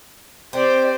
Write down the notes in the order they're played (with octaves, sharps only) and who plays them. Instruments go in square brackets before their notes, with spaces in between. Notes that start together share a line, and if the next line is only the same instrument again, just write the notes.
[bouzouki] C4 [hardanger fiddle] G4 D5 [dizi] C5